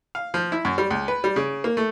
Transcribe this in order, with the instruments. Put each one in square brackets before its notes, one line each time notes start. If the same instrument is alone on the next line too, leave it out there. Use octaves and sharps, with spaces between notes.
[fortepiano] F5
F3
E4
F#2
G3
C#2
B4
G3
C#3
A#3
A3